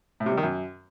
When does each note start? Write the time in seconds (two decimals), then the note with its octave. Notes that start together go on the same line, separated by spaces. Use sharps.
0.20 A2
0.26 C3
0.32 G3
0.37 D#3
0.43 F#2